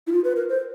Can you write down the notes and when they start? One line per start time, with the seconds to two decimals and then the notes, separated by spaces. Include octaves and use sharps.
0.07 E4
0.12 F4
0.24 B4
0.36 A#4
0.49 C5